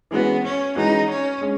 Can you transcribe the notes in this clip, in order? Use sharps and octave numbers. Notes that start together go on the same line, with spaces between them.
E3 G#3 B3 C#4 F#4
C#4
E3 G#3 C#4 D#4 F#4
C#4
G#3 C#4